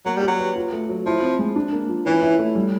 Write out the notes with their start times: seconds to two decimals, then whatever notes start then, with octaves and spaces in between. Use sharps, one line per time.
0.06 F#3 A#3
0.17 G3
0.23 G4
0.28 F#3
0.39 B4
0.56 F4
0.73 A3
0.89 F#3
1.06 F3 E4
1.22 C4
1.39 G#3
1.56 D4
1.73 A#3
1.89 F3
2.06 E3 C#4
2.22 E4
2.39 A3
2.55 G3